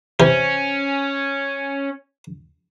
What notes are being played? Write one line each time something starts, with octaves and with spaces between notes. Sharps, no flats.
C3 E3 C#4 C5